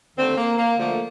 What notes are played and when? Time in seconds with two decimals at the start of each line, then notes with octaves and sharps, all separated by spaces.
0.16 D#2 D3 A3 C4
0.36 A#3
0.58 A#3
0.78 D2 D3 F3 A3 A#3